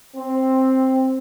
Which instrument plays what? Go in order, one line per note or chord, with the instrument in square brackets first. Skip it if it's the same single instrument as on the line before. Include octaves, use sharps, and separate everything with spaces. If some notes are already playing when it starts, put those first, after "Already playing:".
[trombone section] C4